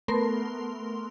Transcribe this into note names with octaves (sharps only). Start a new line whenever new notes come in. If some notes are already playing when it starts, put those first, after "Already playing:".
A3 B3 A#4 C6